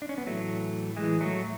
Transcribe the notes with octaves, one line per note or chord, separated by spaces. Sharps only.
D4
C#4
B3
A2 E3 F#3 A3
E3 G#3
F#3 A3